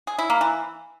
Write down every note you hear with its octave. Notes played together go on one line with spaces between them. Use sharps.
G#4
E4
A#3
E3